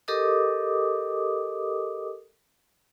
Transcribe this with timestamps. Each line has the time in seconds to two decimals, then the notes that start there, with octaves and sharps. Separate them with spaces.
0.08 G4 A4 A#4 D#5 D6 D#6